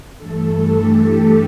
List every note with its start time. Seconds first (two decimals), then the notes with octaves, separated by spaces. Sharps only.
0.15 G2 E3 A3 A4
0.71 G4